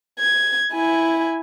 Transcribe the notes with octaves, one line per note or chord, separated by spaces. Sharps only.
G#6
E4 G#5